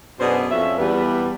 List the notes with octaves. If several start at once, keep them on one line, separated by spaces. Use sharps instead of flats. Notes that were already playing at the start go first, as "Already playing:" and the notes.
F#2 B2 D4 G#4 B4 C5
F2 C#4 E5
E2 G3 B4